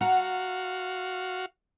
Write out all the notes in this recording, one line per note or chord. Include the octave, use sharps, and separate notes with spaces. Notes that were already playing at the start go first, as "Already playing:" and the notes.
F#4 F5 F#5 A#5